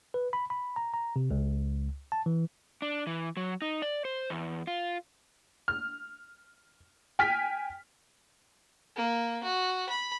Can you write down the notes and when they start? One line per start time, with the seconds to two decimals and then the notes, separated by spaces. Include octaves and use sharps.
0.14 B4
0.33 B5
0.50 B5
0.76 A#5
0.94 A#5
1.16 C3
1.31 C#2
2.12 A5
2.26 E3
2.82 D4
3.07 E3
3.37 F#3
3.62 D#4
3.82 D5
4.05 C5
4.30 E2
4.67 F4
5.68 F6
7.19 G5 G#5 F6 B6
8.96 A#3
9.44 F#4
9.89 B5